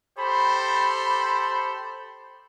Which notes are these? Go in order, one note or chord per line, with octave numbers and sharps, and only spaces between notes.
G4 A4 C5 B5